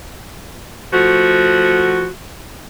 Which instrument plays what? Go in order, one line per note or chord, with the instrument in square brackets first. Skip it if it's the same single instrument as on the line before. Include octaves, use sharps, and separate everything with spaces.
[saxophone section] F3 A3 F#4